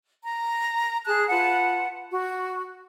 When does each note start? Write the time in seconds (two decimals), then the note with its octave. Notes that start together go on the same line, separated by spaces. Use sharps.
0.24 A#5
1.06 G#4 A5 F#6
1.30 F4 B4 F#5 A5
2.11 F#4